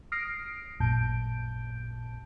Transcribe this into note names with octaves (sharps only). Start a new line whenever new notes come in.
D#6 F6 A#6 C7 D7
A1 F#2 A#2 A5 G6 D7